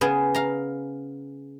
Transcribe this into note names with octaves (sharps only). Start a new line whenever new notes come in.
C#3 B3 G#4
F5 A#5